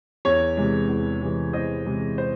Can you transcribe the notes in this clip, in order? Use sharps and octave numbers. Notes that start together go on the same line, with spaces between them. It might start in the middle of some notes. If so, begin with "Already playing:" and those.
E2 C#5
C3 E3 G#3
E2
C3 E3 G#3
E2 C5 D#5
C3 E3 G#3
C5